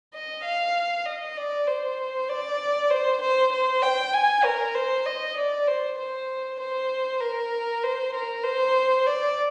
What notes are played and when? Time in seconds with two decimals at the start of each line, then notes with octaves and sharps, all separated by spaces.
0.14 D#5
0.44 F5
1.05 D#5
1.37 D5
1.67 C5
2.29 D5
2.90 C5
3.21 C5
3.52 C5
3.82 G5
4.14 G#5
4.44 A#4
4.75 C5
5.06 D#5
5.37 D5
5.68 C5
5.99 C5
6.60 C5
7.21 A#4
7.83 C5
8.14 A#4
8.44 C5
9.07 D5